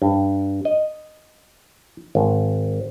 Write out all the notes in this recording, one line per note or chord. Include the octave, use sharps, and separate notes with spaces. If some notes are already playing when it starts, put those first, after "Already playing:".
G2
D#5
G#1